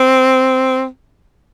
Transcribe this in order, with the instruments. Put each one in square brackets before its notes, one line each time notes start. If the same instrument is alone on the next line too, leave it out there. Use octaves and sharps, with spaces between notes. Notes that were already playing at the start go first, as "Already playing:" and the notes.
Already playing: [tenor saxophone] C4